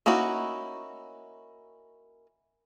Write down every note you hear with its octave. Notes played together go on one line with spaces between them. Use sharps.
A#3 C#4 D#4 E4 F#4